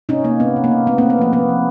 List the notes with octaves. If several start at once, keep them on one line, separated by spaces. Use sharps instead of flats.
C3 C#4 D#4
C3 A#3
C3 B3
C3
A#3
C3
A3 B3
A#3 C4
C3
B3
F3 A#3
C3 B3
F3